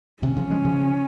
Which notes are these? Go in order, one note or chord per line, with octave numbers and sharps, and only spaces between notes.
C3 D#3 C#4
C#3 F3
F3 G#3
C#3 F3